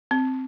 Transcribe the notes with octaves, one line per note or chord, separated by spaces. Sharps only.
C4